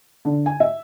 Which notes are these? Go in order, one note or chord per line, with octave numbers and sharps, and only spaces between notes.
D3
G#5
E5